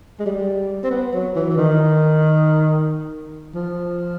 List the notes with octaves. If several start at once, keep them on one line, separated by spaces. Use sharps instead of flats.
G#3
G3
C4
B3
F#3
E3
E3
D#3
F3